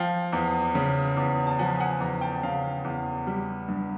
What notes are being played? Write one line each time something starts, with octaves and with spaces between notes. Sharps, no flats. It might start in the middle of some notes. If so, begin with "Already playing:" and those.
Already playing: F3 F5 G5
E2
C#3
E2
A5
F3 F#5 G#5
F#5 G#5
E2 G#5 A#5
G5 A5
C#3 F5 G5
E2
G3
G2